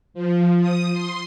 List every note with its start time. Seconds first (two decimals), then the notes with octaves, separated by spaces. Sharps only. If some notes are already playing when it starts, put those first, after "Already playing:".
0.14 F3
0.61 D#6
0.92 C6